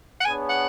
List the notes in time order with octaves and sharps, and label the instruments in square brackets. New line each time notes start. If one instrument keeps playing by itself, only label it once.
[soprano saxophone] F#5
[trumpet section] B3 D4 G#4 C#5 [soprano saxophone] G#5
[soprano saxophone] F#5